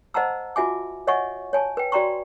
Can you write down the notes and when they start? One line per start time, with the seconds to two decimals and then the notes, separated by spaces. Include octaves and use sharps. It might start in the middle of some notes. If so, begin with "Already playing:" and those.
0.14 C5 D#5 F#5 A5 A#5 E6
0.56 F4 F#4 E5 G#5 D6
1.07 C#5 D#5 E5 F#5 G#5 C#6
1.53 C#5 G#5 A5
1.77 B4 G5
1.92 F#4 D5 G5 A#5 C6 C#6